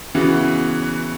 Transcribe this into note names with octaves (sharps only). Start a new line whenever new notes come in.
C#3 E3 B3 F#4